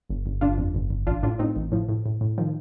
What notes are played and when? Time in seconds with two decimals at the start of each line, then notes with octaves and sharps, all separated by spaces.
0.09 G1
0.26 G1
0.41 G1 D4 F4
0.58 F2
0.75 G1
0.90 G1
1.07 A1 D4 F4
1.23 A2 D4 F4
1.39 A2 C4 D#4
1.56 A1
1.72 A2 F3
1.89 A2
2.06 A2
2.21 A2
2.38 D#3 F3